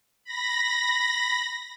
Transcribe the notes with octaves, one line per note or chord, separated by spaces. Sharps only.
B5 A#6